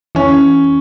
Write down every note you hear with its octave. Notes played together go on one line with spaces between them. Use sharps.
E3 C#4